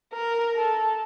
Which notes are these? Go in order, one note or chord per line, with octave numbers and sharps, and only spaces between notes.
A#4
A4